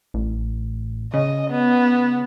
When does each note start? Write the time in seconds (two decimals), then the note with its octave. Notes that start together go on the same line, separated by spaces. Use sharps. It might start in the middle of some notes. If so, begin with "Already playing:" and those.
0.14 A1
1.14 C#3 D#5
1.51 B3